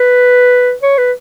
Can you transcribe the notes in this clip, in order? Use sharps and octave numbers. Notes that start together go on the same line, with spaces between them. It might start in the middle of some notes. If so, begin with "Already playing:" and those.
Already playing: B4
C#5
B4